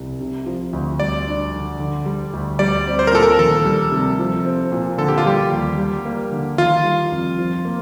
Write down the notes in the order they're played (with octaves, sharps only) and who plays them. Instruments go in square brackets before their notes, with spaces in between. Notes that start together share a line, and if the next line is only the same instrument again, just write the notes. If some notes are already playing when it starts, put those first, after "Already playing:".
Already playing: [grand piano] C2
C3
F3
D2
[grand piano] G3 [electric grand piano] D5
[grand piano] D4
D3
D3
G3
D2
[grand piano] G3 [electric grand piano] D5
[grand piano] C4
[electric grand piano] C5
A#4
[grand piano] A#2 [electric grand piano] A4
[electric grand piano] A#4
[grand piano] D#3 [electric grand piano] A4
[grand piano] G3
C3
F3
C4
A#2
[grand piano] D3 [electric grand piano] A4
[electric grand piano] G4
F4
[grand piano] G3 [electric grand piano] G4
[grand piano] D#2
G3
A#3
D3
[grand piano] D#3 [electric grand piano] F4
[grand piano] G3
F2
F3
A#3